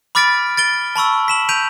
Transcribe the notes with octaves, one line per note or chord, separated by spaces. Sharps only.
B5 D6 F6 A6 B6 D7
A6 D7 G7
A5 B5 C#6 E6
B6 E7 F#7
G6 B6 D7 D#7 F7